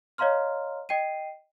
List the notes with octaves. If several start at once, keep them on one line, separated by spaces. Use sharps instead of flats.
C#5 D#5 F5 A#5 C6 F6
D#5 G5 C7 D#7